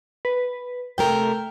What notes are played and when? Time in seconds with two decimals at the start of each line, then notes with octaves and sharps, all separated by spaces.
0.25 B4
0.98 C3 A3 A#4 G5